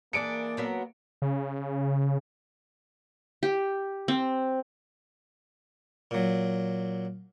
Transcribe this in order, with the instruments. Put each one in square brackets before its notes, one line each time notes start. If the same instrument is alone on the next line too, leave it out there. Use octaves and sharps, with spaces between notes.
[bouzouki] E3 D4 [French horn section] A#3 [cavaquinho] G#4 D5 [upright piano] C#7 D7
[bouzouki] F#3 B3 A#4
[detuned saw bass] C#3
[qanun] G4
C4
[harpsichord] A#2 F#3